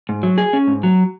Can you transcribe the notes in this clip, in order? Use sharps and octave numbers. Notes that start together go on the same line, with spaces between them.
G#2
F#3
G#4
C#4
G#2
F#3